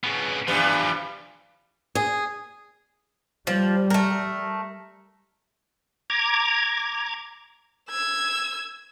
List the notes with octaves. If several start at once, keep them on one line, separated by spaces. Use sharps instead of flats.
C#3 B3
G2 E3 F3 G3 B3
G#4
F3 G3
A3 A#4
A#5 D6 G#6
E6 G#6